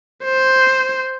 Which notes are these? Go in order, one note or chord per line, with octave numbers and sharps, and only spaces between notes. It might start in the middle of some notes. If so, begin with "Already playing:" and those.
C5